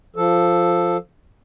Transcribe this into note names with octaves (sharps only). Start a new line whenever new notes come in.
F3 A4